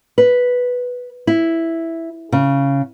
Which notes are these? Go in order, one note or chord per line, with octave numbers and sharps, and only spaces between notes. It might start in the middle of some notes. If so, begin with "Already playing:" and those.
B4
E4
C#3